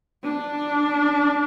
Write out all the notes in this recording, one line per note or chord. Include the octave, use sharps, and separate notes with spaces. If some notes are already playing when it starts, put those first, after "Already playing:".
D4